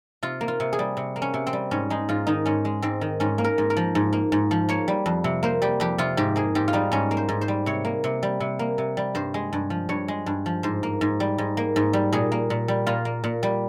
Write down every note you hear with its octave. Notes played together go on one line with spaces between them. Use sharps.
C3 F4
A#3
F4
C3
G#4
G3
C3
A#3
C#4
C3
C4
G3
G#2 C#4
G#3 D#4
G#2 F4
D#3 D#4
G#2 C#4
G#3
G#2 C4
D#3
G#2 C#4
A#3
A#4
G#2
A#4
F3
G#2
A#3
G#2
F3
A#3 C#5
G3
F2
C3
A#3 C5
G3 G4
F2 G4
C3 F4
G#2 G4
A#3 G#4
G#2 G4
F4
G3 D#4
G#2 C#4
A#3
C5
G#2
C5
G3
C3 C#5
A#3
C3
G3
C3
A#3
C3
G3
G2 C5
G#3
G2
F3
G2 C#5
G#3
G2
F3
G#2 C5
A#3
G#2
G3
G#2
A#3
G#2
G3
A#2 G#4
A#3
A#2
G3
A#2 F4
A#3
A#2
G3